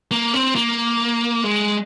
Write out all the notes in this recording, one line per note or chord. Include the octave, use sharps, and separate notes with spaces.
A#3
C4
A#3
G#3